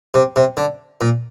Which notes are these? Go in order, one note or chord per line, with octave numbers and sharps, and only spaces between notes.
C3
C3
D3
A#2